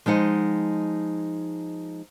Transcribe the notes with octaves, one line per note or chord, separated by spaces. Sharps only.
F3 G#3 D#4 F#5